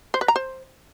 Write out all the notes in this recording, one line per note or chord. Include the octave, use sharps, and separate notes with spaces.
C5
B4
A#5
C5